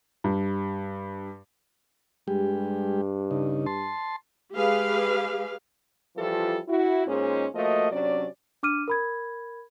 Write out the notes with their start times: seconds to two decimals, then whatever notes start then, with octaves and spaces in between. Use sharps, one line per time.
0.24 G2
2.28 G2 G3 G#3 G4
3.31 C#3 D#4
3.66 A5 C6
4.55 G#3 G4 G#4 B4 F5
6.17 E3 F3 G3 E4 F4 A4
6.69 E4 F#4
7.07 A#2 G#3 C#4 D#4 G#4 C5
7.54 F3 A3 A#3 F#4 D#5
7.92 C3 F#3 C#4 D4 D5
8.63 D4 D6 F6 D#7
8.88 A#4 B5 G#6